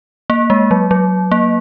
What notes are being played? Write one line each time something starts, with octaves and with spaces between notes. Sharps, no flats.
A#3
G#3
F#3
F#3
A#3